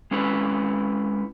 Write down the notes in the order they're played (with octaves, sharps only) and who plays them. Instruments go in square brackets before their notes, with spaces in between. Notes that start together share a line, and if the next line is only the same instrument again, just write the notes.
[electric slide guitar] G#3 C#4 E4 B4